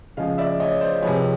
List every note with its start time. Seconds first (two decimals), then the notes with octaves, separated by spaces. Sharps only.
0.17 C#3 F3 G#3 D#5 F5
0.38 D5 E5
0.60 C#5 D#5
0.81 C5 D5
1.02 C3 F3 G#3 B4 C#5